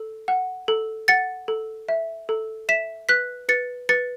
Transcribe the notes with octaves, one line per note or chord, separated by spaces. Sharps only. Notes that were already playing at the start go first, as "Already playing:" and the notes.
Already playing: A4
F#5
A4
F#5 A6 C#7
A4
E5
A4
E5 B6 E7
B4 F#6 B6
B4 A6 C#7
B4 A6 C#7